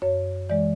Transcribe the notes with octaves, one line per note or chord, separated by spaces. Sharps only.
F#2 C#5
E3 G#3 D5